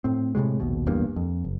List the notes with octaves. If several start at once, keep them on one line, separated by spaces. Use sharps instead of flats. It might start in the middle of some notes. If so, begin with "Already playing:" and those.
A2 C4
A2 C3 F#3 G#3
A#1 D#2 B2
D1 E2 G2 A#3
F2
F#1